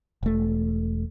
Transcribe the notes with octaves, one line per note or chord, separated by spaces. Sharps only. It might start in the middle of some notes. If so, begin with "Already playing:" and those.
E1 A3